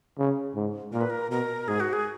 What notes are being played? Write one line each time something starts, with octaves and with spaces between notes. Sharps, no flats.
C#3
G#2
A#2 A#4
B4
A#4
B2 A#4
G#2 G#4
F#4
G#4